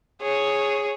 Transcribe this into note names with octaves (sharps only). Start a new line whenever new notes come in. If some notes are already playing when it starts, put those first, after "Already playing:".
G#4 C#5